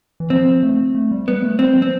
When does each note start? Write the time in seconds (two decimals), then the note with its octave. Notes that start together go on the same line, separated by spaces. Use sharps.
0.20 E3
0.30 F3 C4
0.63 A3
0.95 A3
1.11 G3
1.28 G3 B3
1.44 A3
1.59 G3 C4
1.75 F3
1.82 C4